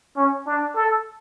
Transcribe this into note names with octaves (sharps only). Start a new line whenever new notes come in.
C#4
D4
A4